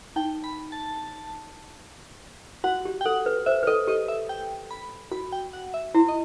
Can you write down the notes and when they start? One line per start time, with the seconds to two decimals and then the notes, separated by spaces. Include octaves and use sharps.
0.16 D#4 G5
0.44 B5
0.72 A5
2.64 F#4 F#5
2.85 G4
3.01 G5
3.05 A4 F#5
3.26 B4
3.46 C5 E5
3.63 B4
3.67 A4 D#5
3.88 G4 D#5
4.08 E5
4.29 G5
4.71 B5
5.12 F#4 B5
5.32 G5
5.53 F#5
5.74 E5
5.95 E4 C5
6.08 D#5